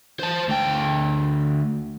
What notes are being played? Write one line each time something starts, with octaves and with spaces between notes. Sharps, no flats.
C5 A5
D2 G5